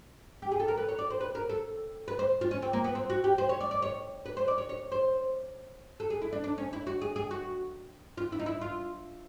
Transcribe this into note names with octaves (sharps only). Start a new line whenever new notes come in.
G4
G#4
A4
A#4
B4
C#5
D5
C5
B4
A#4
A4
B4
C5
F4
C#4
C4
A#3
B3
C4
F#4
G4
C5
C#5
D5
D5
C#5
B4
C5
D5
C#5
C#5
C5
A4
G#4
E4
D4
D4
C#4
E4
F#4
G#4
G#4
F#4
F4
E4
D#4
E4
F4